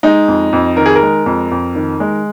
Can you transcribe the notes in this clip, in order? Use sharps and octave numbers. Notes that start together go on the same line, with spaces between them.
G#3 D#4
F2
F2
D#3 A#4
G#4
A#4
G#3
F2
F2
D#3
G#3